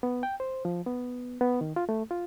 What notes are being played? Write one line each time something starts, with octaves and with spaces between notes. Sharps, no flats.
B3
G5
C5
F3
B3
B3
D#3
F4
A3
F4